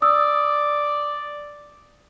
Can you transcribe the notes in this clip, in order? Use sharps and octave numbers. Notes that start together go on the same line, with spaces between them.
D5 D#6 E6